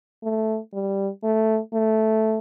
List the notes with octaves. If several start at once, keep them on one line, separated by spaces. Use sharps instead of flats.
A3
G3
A3
A3